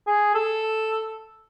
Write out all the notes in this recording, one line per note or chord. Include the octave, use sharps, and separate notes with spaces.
G#4
A4